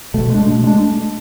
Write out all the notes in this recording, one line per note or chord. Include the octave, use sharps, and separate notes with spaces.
B2 A3
G#3 D4
B2
G#3 D4